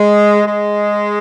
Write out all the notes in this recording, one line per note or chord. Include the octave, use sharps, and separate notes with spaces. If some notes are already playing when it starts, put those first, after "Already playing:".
Already playing: G#3
G#3